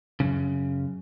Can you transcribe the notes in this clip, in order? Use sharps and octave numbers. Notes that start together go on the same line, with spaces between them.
F#2 C#3